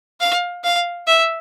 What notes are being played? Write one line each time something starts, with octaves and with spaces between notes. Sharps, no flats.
F5
F5
E5